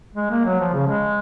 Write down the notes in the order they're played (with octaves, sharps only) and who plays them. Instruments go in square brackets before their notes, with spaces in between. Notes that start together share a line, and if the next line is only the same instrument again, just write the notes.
[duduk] G#3
A#3
F#3
F3
C#3
G#3